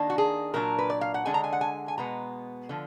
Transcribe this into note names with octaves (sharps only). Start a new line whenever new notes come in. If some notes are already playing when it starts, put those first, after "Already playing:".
Already playing: D#3 A#3 D4
F#4
G#4
A#2 F#3 D4 A#4
B4
D5
F5
F#5
D3 G#3 D4 G#5
A#5
G#5
F#5
G#5
G#5
B2 G#3 B3 A#5
D3 F3